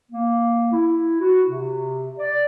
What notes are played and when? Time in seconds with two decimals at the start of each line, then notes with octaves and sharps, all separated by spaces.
0.10 A#3
0.71 E4
1.20 F#4
1.49 C3
2.17 D5